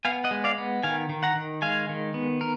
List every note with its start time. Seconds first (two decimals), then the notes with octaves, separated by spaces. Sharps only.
0.05 B3 F5 G#5
0.24 D#5 F#5
0.31 G#3
0.44 D5 F5
0.58 B3
0.83 D#3 F5 G#5
1.09 D#3
1.23 F#5 A#5
1.35 D#3
1.62 G#3 F5 G#5
1.89 D#3
2.14 B3
2.41 A#4